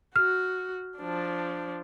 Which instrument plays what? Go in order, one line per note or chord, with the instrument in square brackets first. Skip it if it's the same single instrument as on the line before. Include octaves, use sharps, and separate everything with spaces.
[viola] F#4 [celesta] F6
[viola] F3 D4